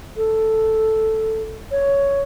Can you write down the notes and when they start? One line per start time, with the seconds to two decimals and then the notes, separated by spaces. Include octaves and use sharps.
0.17 A4
1.72 C#5